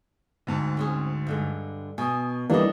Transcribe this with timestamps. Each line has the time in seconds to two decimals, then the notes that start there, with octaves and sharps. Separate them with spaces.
0.47 D2 G#2 A5
0.77 C4 C#4 G#4
1.27 G2 D3 G#3
1.98 B2 G#5 D#6
2.50 E3 G3 A#3 D4 D#4 A4 D#5